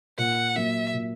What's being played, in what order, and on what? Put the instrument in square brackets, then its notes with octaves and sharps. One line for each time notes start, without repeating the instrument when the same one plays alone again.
[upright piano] A#2 [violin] F#5
[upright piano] F#3 A#3 [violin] E5
[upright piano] A#2